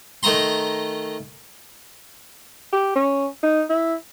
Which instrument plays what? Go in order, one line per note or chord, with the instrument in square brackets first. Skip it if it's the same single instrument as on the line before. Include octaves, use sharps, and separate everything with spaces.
[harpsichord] D#3 A3 D#5 A#5 C6
[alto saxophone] G4
C#4
D#4
E4